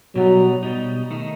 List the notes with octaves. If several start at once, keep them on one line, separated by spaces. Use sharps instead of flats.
B2 F#3 G3 D#4
B2 G3 D#4
D#3 A3 D#4